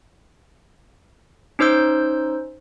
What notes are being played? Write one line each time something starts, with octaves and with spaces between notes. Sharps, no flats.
C#4 D#4 C5 E6 G6